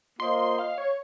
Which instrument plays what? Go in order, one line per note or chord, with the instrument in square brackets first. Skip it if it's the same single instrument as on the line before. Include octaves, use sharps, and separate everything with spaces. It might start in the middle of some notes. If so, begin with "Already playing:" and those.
[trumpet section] A#3 F4 C5 D#5 [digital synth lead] C6
[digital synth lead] C6
F5
C#5